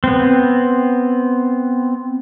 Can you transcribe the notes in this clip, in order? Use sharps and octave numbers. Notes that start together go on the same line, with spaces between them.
B3 C4